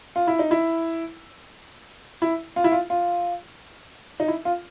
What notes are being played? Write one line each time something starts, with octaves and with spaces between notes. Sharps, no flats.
F4
E4
D#4
E4
E4
F4
E4
F4
F4
D#4
E4
F4